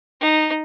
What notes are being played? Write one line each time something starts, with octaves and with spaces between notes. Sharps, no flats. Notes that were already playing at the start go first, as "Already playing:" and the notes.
D#4